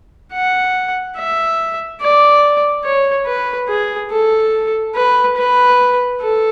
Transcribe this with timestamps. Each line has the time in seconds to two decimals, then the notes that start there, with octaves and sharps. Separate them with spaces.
0.32 F#5
1.17 E5
2.01 D5
2.84 C#5
3.26 B4
3.68 G#4
4.11 A4
4.95 B4
5.37 B4
6.21 A4